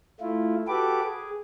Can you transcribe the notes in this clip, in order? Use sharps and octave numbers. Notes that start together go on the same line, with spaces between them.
A3 E4 F4
F#4 G4 A4 B4 D6
G#4